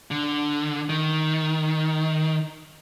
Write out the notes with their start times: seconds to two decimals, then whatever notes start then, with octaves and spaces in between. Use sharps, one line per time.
0.11 D3
0.89 D#3